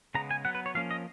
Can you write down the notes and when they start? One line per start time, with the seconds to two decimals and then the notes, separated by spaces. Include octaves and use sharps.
0.15 C#3 G#3 B3 A#5
0.31 G#5
0.45 F#3 B3 F#5
0.55 B4
0.66 C#5
0.75 F3 A#3 C#4 F5
0.91 D#5